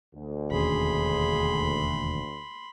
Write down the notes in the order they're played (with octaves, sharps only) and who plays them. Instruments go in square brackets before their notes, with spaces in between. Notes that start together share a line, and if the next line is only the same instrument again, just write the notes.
[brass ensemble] D2
[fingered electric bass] E1 D#2 C#4 [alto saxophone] G#4 [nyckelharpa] B5 C6